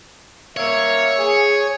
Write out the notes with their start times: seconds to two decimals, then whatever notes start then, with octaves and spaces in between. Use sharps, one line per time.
0.57 A#3 C#5 E5 F5
1.19 G#4